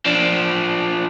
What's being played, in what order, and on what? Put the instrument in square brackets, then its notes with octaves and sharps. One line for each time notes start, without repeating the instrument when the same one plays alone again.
[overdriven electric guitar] F3 D4